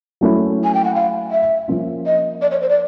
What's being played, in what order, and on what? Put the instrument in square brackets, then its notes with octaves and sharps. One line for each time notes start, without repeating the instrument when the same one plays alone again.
[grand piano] F#3 A3 C#4 E4
[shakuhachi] G#5
G5
F#5
F5
E5
[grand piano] F3 A#3 C#4 F4
[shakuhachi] D#5
D5
C#5
C5
D5